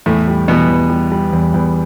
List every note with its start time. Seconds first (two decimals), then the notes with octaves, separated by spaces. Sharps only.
0.06 E2 A2 A3
0.28 G3
0.48 B2 E3 B3
0.69 E2
0.90 G3
1.12 G3
1.33 E2
1.54 E2